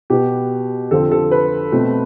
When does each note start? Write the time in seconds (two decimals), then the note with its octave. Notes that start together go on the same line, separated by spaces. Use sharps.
0.10 B2 B3 G4
0.91 F2 D3 F3 C4 A4
1.12 A4
1.31 B4
1.72 B2 A3 C4